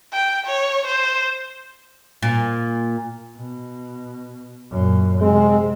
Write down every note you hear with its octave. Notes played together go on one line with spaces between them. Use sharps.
G5
C#5
C5
A#2
B2
F#2 A#2
C3 G#3 C4